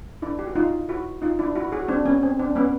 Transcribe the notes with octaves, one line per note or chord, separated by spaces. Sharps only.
D4 E4
G4
F#4
D#4 F4
E4 F#4
D#4 F4
D4 E4
E4 F#4
F#4 G#4
C4 D4
B3 C#4
C4
C4 D4
B3 C#4